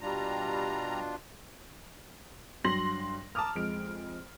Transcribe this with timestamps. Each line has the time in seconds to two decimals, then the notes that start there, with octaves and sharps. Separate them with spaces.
0.01 B2 G3 D4 F4 A#5
2.64 G2 F#3 C6 A#6 F#7
3.35 A5 A#5 D6 D#6 F6
3.55 F2 G#3 D7